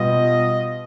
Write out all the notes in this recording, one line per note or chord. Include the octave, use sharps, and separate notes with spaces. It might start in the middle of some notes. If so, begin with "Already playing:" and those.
Already playing: B2 G3 B3 F4 D#5